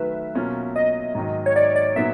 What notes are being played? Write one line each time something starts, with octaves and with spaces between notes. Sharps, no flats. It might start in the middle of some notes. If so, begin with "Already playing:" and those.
Already playing: D#3 F#3 A3 B4 E5
B2 F#3 A#3 C#4 F4
D#5
G#2 D#3 F#3
C#5
D5
D5
A#2 F#3 B3 D#4 E5